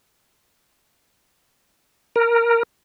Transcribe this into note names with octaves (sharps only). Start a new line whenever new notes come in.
A#4